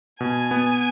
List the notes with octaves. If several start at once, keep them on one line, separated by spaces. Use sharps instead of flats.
B2 G#5
B3